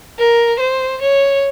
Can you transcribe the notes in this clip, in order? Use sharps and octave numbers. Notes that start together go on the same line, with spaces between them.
A#4
C5
C#5